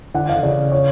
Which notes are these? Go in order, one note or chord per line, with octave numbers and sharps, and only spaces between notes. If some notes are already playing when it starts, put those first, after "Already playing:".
D3 F#5
F5
C#3 D5
C#5